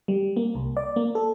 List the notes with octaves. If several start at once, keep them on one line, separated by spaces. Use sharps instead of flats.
G3
A#3
C2
D5
A#3
A4